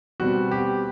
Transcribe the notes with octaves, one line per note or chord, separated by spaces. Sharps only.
B2 G3 C4 F#4
G4